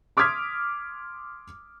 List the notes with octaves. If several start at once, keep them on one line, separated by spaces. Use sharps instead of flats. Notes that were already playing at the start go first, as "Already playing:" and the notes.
C6 D6 D#6 F6 G#6 B6